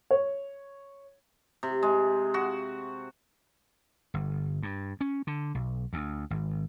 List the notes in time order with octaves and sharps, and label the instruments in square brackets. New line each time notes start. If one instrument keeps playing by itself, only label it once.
[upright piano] C#5
[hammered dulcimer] C3
G#3
F#4
[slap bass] G1
G2
C#4
D3
B1
D2
G#1